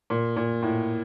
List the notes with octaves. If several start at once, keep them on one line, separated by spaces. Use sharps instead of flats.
A#2
A#2
A2